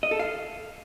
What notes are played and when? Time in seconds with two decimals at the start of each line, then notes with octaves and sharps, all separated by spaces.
0.03 D#5
0.11 A4
0.19 F5